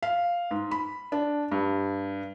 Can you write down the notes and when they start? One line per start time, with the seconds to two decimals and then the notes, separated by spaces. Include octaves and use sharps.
0.03 F5
0.51 G#2
0.71 B5
1.12 D4
1.52 G2